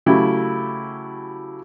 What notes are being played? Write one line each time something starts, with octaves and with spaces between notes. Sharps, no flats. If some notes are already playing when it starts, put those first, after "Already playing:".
C#3 F#3 A3 E4 G4